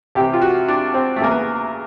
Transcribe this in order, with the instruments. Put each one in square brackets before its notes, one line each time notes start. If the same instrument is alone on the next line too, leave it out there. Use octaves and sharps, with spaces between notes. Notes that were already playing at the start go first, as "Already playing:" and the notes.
[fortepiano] C2 C3 E3 G4
F4
F#4
D4
C4
A3
E2 C#3 E3 A#3
B3